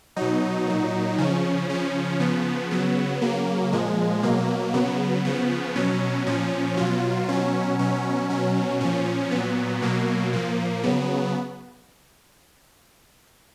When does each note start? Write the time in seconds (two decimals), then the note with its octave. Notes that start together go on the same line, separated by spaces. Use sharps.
0.16 B2 F#3 D#4
0.67 A#2 F#3
1.18 C#3 F3 C#4
1.69 C#3 F3 C#4
2.20 C#3 F3 B3
2.71 C#3 F#3 B3
3.21 C#3 F#3 A#3
3.73 A#2 F3 G#3
4.23 B2 F#3 A#3
4.74 C#3 F#3 B3
5.25 C#3 F3 B3
5.75 B2 F#3 C#4
6.27 A#2 F3 C#4
6.77 B2 F#3 F4
7.28 B2 F#3 C#4
7.79 B2 F#3 C#4
8.29 B2 F#3 C#4
8.81 A#2 F3 C#4
9.31 A#2 F#3 B3
9.82 B2 F#3 A#3
10.33 A#2 F3 A#3
10.83 C#3 F#3 B3